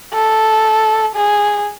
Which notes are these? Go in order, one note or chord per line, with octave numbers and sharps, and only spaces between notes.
A4
G#4